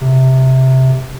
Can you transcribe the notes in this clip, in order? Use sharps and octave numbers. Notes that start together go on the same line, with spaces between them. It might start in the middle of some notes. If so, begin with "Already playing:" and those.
C3